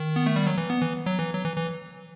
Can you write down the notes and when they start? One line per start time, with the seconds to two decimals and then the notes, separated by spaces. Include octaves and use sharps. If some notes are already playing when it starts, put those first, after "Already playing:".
Already playing: D#3
0.16 B3
0.26 A3
0.36 G3
0.47 F#3
0.57 E3
0.70 B3
0.82 E3
1.06 F#3
1.19 E3
1.34 F#3
1.44 E3
1.56 E3